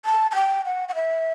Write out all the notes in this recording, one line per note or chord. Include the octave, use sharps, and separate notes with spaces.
A5
A5
G5
F#5
F#5
E5